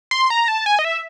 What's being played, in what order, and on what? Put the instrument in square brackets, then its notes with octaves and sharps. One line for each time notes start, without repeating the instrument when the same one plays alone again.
[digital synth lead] C6
A#5
A5
G#5
D#5
E5